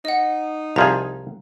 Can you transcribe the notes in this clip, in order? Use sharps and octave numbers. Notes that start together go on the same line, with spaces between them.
D#4 D#5 F#5
C2 F3 G#4 A#5